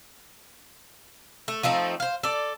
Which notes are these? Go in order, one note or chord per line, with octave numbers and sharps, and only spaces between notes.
A3
F3 A3 C4 D#4
C5 F5
A4 D5